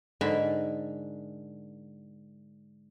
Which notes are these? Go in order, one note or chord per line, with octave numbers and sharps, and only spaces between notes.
G#2 D3 A#4 G#5 B5